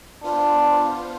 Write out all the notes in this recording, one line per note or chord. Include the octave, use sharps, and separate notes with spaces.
B3 D4 F4 C5